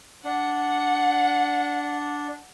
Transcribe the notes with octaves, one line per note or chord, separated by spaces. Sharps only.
D4 F#5